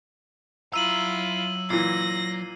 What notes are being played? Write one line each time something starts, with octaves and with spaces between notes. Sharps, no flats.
F#3 E4 F4 A#5 E6 D#7 F#7
A#2 E3 A#6 C7